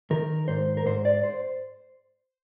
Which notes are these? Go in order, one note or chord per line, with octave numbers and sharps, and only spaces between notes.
D#3 A#4
G#2 C5
A#4
G#2 C5
D5
C5